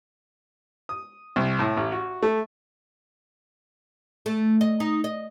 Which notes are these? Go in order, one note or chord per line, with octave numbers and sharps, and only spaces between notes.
D#6
C2
A2
A1
F#4
A3
A3
D#5
D#4
D#5